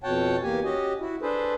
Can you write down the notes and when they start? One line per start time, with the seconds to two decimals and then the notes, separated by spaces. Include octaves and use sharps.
0.04 F2 B2 C#5 F#5 G5 A5
0.43 E2 A#3 G4 G#5
0.64 C#4 F#4 G4 D#5
1.01 E4 F#4
1.22 D4 G#4 A4 B4 C5